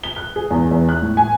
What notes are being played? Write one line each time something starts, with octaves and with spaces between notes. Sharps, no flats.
G7
F#6
G#4
E2
E2
F#6
A2
G#5